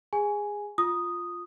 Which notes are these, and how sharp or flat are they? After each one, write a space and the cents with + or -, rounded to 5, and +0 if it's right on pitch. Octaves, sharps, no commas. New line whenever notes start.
G#4 -20 G#5 +0
F4 +0 D#6 -5